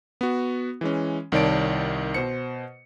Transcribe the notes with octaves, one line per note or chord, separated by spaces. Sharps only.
B3 F#4
E3 G#3 C#4
C2 D#3 C#5 D5 A5 D7
B2 C5 C#7